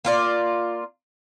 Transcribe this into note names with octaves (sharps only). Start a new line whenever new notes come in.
A#3 F4 D5